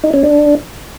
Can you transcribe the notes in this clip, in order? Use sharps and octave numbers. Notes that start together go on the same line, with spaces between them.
D#4
C#4
D4